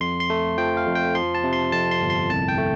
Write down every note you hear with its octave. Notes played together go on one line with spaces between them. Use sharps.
F2 C6
C6
A3
F3 G5
F5
F2
G5
F3 C6
A5
C3
C6
F2 A5
C6
G1
C6
C2 A5
G5
A3